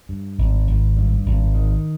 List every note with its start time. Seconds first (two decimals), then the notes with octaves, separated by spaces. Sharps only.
0.09 G2
0.38 G#1
0.67 G#1
0.97 G2
1.26 G#1
1.55 D#3